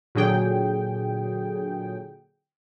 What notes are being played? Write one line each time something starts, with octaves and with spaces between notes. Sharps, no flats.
A#2 D3 F#3 G#4 G5